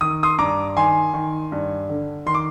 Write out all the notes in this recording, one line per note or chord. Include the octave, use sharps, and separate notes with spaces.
D#3 D#6
C6 D#6
G2 A#5 D6
D#3 G#5 C6
D#3
G2
D3
D#3 C6
D6